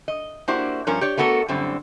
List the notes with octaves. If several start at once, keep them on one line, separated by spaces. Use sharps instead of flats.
D#5
A#3 D4 E4 F#4 G4 C5
G2 F3 C#4 A#4
G4 C#5 D5
A3 B3 F#4 A4 A#4
F#2 A2 D3 G3 C4